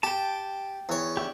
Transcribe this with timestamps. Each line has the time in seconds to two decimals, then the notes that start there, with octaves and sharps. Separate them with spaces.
0.03 G4 G5 A5
0.89 E2 C#5
1.17 D4 E4 G4